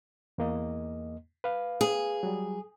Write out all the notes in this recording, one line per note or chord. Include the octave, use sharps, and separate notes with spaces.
E2 A#3 D#5
B4 F5
G#4
F#3 G3